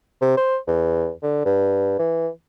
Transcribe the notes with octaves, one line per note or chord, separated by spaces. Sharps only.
C3
C5
E2
D3
G2
E3